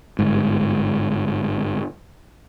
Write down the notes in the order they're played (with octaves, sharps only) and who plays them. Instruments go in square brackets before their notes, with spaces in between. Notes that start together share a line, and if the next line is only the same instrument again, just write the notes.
[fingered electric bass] G1 G#2